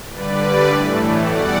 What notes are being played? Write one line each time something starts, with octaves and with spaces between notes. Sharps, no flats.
G2 D3 G3 B4 D5
A2 E3 A3
E2 B2 G3 D5 F#5